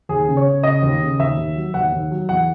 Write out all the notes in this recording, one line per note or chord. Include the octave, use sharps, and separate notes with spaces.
D#2 G#4
C#3
C#5
C#3
C#3 D#5
D#2
C#3
D#2 E5
D#2
F#3
D#2 F#5
D#2
F#3
E2 F#5